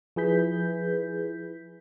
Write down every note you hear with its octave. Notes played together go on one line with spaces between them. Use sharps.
F3 E4 G#4 B4 G6 B6